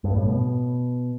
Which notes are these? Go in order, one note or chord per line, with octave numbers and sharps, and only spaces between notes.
G2
A2
B2